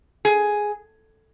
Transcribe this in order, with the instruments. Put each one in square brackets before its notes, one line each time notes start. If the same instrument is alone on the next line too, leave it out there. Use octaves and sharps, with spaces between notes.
[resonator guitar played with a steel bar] G#4